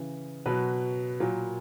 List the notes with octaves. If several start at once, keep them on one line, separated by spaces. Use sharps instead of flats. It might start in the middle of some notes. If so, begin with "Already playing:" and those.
Already playing: C#3 E3
B2 F#3 B4
A#2 F#3